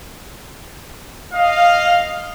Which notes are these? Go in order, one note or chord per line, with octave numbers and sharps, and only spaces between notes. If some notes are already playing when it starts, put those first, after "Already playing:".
D#5 F5